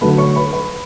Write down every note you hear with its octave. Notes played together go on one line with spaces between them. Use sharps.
D3 F#3 A3 B4 B5
C#5 C#6
B4 B5
B4 B5